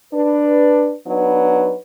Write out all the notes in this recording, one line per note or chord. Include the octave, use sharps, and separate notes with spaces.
D4 B4
F#3 B3 D4 D#4 B4